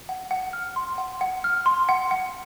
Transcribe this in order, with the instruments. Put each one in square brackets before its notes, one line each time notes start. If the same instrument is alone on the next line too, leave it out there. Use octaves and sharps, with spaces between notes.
[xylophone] F#5
F#5
F6
C6
F#5
F#5
F6
C6
F#5
F#5